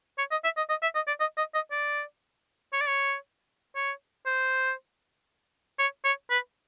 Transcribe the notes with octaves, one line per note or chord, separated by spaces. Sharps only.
C#5
D#5
E5
D#5
D#5
E5
D#5
D5
D#5
D#5
D#5
D5
C#5
D5
C#5
C#5
C5
C#5
C#5
B4